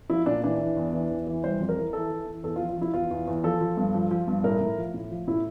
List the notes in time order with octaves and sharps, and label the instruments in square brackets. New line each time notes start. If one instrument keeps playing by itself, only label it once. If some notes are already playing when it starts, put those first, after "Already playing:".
[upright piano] F3 E4
A#2 D4
E3 D4
E3
E2
E3
E2
E3
G3 C5
F2
A#4
E3
E3 A4
E3
E3
E2 A4
F4
F3
F4
F3 E4
E2 F4
E2
E2
F3 A4
F3
G2
F3
F3
G2
A2 A#4
A2
F3
A2
F3
A2 E4